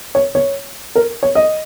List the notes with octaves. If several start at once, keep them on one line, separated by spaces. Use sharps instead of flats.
C#5
C#5
A#4
C#5
D#5